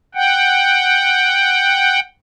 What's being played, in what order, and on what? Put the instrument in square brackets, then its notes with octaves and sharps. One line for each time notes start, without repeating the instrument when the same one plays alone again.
[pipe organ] F#5 G5